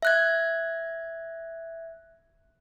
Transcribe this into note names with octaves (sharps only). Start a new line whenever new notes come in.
E5 F#6 G#6